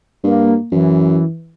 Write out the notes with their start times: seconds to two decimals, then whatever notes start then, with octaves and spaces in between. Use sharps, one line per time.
0.24 G2 A#3
0.72 F#2 E3